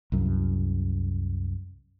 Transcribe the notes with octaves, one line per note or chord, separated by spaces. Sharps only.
C2 F#2